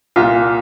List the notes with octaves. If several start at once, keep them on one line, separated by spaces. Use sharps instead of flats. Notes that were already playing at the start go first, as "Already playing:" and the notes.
C2 A#2 F4